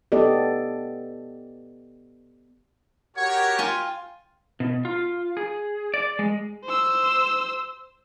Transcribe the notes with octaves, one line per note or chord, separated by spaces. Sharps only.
B3 G4 A4 D5 D#5
F#4 G4 A#4 C#5 F#5
F4 G5 G#5
B2
F4
G#4
D5
G#3
C5 E6